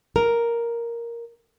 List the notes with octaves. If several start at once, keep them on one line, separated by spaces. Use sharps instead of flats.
A#4